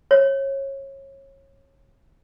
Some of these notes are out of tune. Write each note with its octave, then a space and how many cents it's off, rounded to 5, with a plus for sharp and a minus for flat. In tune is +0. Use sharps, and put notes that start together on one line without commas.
C#5 -25